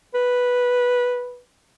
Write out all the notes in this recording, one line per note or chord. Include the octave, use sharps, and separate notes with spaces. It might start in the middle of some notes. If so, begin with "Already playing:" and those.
B4